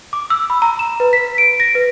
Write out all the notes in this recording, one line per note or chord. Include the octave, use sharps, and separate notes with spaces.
D6
E6
B5
A#5
E7
B4
B6
D7
A#6
B4